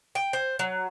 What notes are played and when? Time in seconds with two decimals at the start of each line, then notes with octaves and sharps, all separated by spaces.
0.15 G5
0.33 C5
0.59 F#3